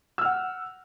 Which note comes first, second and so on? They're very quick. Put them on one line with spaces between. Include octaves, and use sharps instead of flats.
E6 F6 F#5